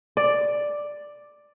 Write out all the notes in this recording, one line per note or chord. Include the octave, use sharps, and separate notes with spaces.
D5